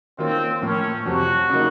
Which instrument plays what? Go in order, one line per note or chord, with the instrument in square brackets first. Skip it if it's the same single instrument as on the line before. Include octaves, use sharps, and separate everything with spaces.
[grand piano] D#3 A#3 C#4 F4 [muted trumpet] C4
[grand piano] A2 F3 A#3 [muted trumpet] C#4
[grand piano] F2 C3 F#3 [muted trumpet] F#4
[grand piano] C#3 F#3 A#3 D#4